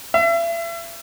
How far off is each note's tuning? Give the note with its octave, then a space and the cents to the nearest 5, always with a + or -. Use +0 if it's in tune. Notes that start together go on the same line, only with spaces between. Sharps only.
E5 +35